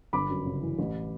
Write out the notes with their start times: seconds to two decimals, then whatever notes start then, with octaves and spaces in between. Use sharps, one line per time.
0.13 G1 B5 D6
0.29 F#2
0.46 C#3
0.62 E3
0.78 A1